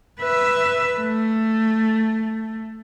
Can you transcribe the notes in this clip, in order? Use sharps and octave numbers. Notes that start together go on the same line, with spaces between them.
B4 E5
A3